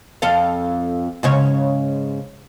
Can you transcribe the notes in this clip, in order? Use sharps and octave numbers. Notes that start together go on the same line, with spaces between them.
F2 A4 F5
G#2 C#3 C#5